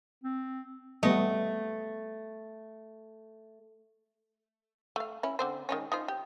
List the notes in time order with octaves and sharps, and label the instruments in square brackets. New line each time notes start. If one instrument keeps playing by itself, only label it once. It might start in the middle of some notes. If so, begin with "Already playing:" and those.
[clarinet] C4
[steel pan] G3 B3 D#5 [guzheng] A3
[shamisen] A3 F5
C#4 E4
D3 C4 C5
D#3 G#3 C#4
D#4 F4 C5
G4